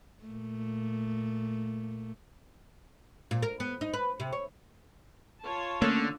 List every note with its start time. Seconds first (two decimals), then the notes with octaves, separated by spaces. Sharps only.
0.24 A#2 A3
3.31 A#2
3.43 A#4
3.60 B3
3.81 D#4
3.93 B4
4.20 C3
4.33 C#5
5.44 F4 C#5 A5
5.82 D3 A3 A#3 C#4